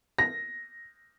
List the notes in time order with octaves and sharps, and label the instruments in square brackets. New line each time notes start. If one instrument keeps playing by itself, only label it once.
[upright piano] A#6